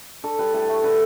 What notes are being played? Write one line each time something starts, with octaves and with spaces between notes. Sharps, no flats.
D4 A4
G3 B4
A2 A4
A3
D3 B4